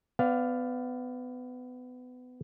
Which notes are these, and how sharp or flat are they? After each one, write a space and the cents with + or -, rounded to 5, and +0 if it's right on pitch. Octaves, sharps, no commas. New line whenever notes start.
B3 +25 D5 +0 F5 +0